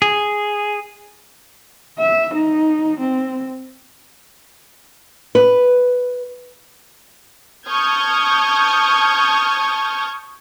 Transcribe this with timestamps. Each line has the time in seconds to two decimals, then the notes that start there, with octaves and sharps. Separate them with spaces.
0.02 G#4
1.98 E5
2.34 D#4
3.00 C4
5.35 B4
7.67 A5 C#6 D#6 F6 G6 G#6